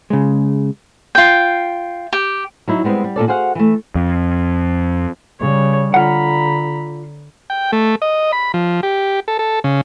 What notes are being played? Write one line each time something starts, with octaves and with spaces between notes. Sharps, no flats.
C#3 G#3
F4 G5
G4
F#3 D#4 E4
G3 G#3 B3 C4
G3
A#2 C#3 A4 D5
F#4 G#4 C5 F5 F#5
E3 A3
F2
C#3 G3 C#5
D3 F4 F#5 A#5 B5
G5
A3
D#5
B5
F3
G4
A4
A4
C#3